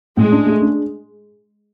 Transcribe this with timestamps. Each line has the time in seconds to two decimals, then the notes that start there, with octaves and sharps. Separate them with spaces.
0.17 A2 G#3
0.32 D4
0.46 A3
0.61 D4